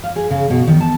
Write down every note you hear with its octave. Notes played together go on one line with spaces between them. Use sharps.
F5
G#4
C#3
B2
D#3
A5